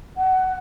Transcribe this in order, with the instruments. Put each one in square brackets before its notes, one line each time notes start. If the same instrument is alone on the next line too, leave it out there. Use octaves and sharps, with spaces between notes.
[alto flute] F#5